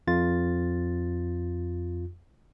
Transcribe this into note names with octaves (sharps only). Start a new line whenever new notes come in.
F2 F4 A6